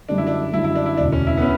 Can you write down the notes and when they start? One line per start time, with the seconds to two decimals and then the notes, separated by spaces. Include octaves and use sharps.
0.09 F#2 D3 G3 D4
0.18 E4
0.27 D4
0.53 F#2 D3 G3 E4
0.64 E4
0.75 D4
0.86 E4
0.97 E1 D2 C#3 D4
1.12 C#4
1.27 E4
1.37 B3
1.42 C#4